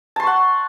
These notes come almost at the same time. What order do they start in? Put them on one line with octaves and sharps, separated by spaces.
A5 C6 C#6 F#5